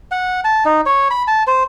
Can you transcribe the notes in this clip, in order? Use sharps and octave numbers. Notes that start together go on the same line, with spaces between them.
F#5
A5
D#4
C#5
B5
A5
C5